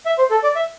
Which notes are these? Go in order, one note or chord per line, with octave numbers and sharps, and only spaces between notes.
E5
C5
A4
D5
E5